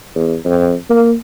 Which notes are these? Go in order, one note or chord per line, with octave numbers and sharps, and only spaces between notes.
E2
F2
A#3